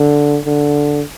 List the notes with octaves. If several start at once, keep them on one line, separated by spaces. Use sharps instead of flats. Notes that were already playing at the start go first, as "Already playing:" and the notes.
Already playing: D3
D3